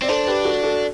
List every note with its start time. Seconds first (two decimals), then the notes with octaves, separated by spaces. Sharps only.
0.02 C4 D5
0.08 D4 A4 C5
0.27 G4 B4
0.45 F#4 A4
0.63 F#4 A4